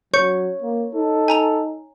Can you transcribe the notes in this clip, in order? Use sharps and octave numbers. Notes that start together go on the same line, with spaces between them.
F#3 C#5 C#6 G6 C#7
A#3
D#4 A4
G#5 A#5 F7